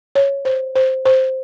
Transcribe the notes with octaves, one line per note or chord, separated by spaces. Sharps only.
C#5
C5
C5
C5